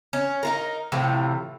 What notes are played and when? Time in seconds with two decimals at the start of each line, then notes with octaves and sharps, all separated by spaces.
0.13 C#4
0.43 D#4 F4 A#4
0.92 A2 C3 E3 F3